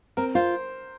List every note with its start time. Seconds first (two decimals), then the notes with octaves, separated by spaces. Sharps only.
0.17 C4 A#4
0.35 F4 C5